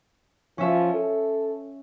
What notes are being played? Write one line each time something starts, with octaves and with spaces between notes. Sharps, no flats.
F3 C#4 E5
A4